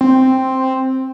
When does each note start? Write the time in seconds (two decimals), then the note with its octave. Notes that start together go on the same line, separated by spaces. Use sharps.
0.01 C4